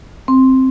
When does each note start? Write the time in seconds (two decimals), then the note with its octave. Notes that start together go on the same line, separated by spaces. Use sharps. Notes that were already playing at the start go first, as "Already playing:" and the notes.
0.28 C4